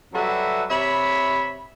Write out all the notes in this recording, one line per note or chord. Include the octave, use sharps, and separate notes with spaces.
F#3 G3 F#4 A4 B4 E5
C3 C#5 E5 B5